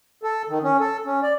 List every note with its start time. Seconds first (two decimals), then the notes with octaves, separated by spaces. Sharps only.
0.23 A4
0.49 D#3
0.63 C#4
0.80 A4
1.05 C#4
1.23 D5